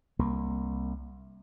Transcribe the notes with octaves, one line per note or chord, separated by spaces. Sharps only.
C2 A#3